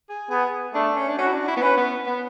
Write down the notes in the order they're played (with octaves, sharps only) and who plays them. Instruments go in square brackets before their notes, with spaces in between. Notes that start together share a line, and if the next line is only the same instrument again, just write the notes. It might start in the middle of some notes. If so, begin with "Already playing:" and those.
[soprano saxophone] G#4
[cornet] B3 [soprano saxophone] G#4
[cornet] A3 [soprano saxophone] D4
[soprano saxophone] C#4
D4
[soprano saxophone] C#4 [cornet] F#4
[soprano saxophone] E4
D4
E4
B3
[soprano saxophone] C#4 [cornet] B4
[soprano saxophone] B3
B3